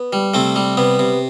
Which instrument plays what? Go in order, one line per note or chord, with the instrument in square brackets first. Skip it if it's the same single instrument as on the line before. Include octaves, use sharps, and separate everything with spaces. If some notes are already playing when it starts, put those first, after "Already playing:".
Already playing: [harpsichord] B3
G3
C3 A3 C4
G3
C3 B3
C3